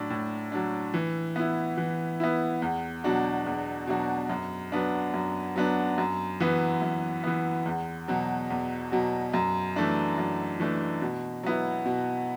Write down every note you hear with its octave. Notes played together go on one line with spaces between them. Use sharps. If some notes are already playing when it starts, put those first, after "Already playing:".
Already playing: A2 F#3 D4
A2
F#3 D4
E3
B3 E4
E3
B3 E4
E2
B2 F#3 D4 F#4
E2
B2 F#3 D4 F#4
F#2
F#3 B3 D4
F#2
F#3 B3 D4
F#2
E3 B3
F#2
E3 B3
E2
B2 F#3
E2
B2 F#3
F#2
E3 A3 D4
F#2
E3 A3 D4
B2
F#3 B3 E4
B2